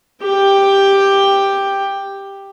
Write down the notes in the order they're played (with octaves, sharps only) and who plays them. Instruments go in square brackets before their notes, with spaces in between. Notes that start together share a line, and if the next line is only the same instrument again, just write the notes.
[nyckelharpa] G4 G5